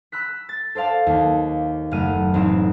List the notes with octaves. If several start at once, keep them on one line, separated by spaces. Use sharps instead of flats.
B5 E6 F#6 B6
A6
A4 C5 D5 F5 A5
D#2
F#1 F#2 A3 F6 D#7
A1 A2 C4 D#4 E7